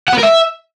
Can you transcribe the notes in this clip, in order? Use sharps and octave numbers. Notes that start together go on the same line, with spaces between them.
F#5
B4
A#4
E5